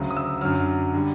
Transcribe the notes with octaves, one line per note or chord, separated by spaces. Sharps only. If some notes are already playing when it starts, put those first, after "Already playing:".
Already playing: D2 C#3 F#3
D#6
E6
F#2 D3 F#3 F6
D3 G3